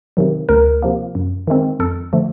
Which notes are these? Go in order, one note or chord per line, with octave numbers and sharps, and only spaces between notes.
C3 D#3 F#3
D2 A#4
C3 F3 A#3
F#2
D#3 G#3 C4
F2 A4
D3 F3 A3